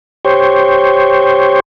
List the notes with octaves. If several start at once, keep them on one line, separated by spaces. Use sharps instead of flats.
G4 C5 C#5